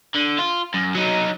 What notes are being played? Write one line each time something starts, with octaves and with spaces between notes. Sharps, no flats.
D3
F4
F#2
F#3 D#4